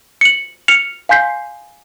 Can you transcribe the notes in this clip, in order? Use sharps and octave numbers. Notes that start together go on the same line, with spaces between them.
C#7 F#7
F6 C#7 F7
F5 G#5 C6 G6 B6 C7